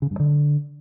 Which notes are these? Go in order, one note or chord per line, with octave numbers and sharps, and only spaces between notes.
C#3
G2
D3